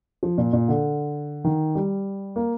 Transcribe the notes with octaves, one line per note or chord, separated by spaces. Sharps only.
F3
A#2
A#2
D3
D#3
G3
A#3